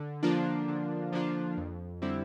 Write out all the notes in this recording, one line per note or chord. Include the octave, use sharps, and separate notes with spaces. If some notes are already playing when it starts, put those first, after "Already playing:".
Already playing: D3
F3 A#3 D4 F4
D3
F3 A#3 D4 F4
F2
D3 G3 C4 E4